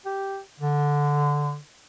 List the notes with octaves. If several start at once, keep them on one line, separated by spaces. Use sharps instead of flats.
G4
D3